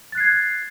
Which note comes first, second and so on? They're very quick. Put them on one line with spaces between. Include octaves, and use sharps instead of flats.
A6 F#6 C7 G#6